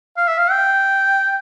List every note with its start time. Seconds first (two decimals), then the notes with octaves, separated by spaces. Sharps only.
0.17 F5
0.27 E5
0.38 F5
0.51 G5